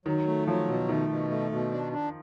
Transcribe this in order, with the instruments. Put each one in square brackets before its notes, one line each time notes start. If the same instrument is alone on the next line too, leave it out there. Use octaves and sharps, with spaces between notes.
[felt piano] D#3 [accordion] F#3
[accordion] A3
[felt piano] F3 [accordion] F#3
[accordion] B2
[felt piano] D#3 [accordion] A3
[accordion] B2
A3
B2
D4
D4